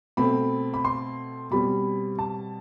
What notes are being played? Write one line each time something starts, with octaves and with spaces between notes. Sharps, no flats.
B2 A3 C4 B5
B5
C6
B2 G3 C4 B5
A5